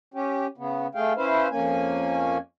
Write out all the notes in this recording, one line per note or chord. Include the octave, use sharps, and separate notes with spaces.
C#4 G4
C#3 B3
A3 G#4 F5 G5
C#4 E4 B4 C5 F5
F2 A#3 C#4 G#5